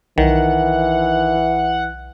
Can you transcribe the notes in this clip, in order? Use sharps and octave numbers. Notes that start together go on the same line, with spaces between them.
B1 D#3 E3 F#5